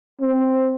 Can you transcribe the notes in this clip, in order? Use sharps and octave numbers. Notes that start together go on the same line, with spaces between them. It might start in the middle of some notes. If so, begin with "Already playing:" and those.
C4